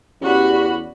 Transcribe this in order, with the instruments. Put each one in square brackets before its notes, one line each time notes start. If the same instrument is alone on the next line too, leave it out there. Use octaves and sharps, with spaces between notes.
[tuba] E2 [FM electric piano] C#4 D5 [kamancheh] F#4 B5 [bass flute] G4